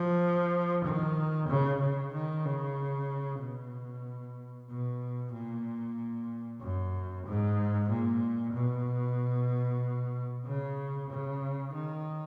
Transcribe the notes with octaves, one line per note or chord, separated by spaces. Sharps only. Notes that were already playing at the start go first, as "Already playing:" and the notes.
Already playing: F3
D#3
C#3
C#3
D#3
C#3
B2
B2
A#2
F#2
G#2
A#2
B2
C#3
C#3
D#3